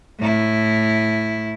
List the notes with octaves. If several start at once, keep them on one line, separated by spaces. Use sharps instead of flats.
A2 E4